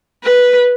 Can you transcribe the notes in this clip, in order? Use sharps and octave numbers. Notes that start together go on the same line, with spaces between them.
B4